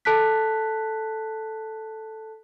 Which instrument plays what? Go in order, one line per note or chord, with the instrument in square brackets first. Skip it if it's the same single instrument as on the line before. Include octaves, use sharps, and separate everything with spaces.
[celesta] A4 A5 F#6 B6